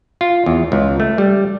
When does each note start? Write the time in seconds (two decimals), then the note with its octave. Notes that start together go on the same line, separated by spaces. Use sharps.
0.21 F4
0.46 E2
0.72 C#2
1.00 A3
1.18 G3